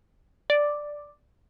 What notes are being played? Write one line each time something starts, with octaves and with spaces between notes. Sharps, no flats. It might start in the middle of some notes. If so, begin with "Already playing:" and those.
D5